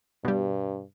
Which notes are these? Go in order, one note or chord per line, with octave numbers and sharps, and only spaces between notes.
G2 B2 G3